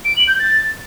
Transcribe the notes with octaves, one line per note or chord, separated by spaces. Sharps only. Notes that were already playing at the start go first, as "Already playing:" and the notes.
D7
F#7
G6
A6